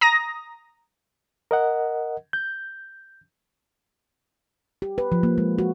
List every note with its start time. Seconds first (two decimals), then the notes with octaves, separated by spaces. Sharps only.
0.01 A#5 D#6 A#6
1.51 A#4 D#5 F#5
2.33 G6
4.82 G4
4.98 B4
5.12 F3
5.23 A#3
5.38 G#3
5.58 F#4